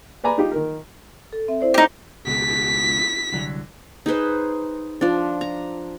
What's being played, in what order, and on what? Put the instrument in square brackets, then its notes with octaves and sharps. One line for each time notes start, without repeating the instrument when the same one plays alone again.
[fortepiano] B4 D5 G#5 A#5 B5
D#4 F4 G4
D#3 A#4
[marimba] A4
C4 E5
E4 C5 D5
[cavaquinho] D#4 G4
[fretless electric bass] C#2 B2 [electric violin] B6
[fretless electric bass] C2 D3 F#3
[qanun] D#4 G#4 B4 C5
F3 D4
A#5